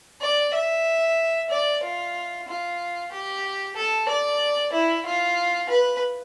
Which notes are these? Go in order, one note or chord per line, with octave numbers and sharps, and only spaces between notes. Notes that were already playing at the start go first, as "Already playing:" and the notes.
D5
E5
D5
F4
F4
G4
A4
D5
E4
F4
B4